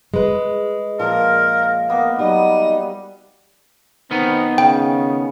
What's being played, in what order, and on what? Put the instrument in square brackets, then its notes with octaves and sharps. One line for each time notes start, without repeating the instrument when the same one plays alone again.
[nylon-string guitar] G#3 B4
[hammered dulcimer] A#2 F3 [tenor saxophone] A#4
[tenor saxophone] A#3 [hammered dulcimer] B3
[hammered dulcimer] F#3 G3 [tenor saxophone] D#4
[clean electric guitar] D#3 B3 D#4 [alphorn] C4
[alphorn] C#3 [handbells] G5